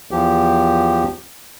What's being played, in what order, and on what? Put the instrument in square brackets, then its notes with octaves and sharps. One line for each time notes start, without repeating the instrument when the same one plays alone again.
[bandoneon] E2 F3 G4